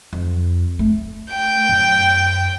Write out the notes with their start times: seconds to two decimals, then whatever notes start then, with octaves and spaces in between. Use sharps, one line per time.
0.13 F2
0.79 A3
1.31 G5
1.69 F#2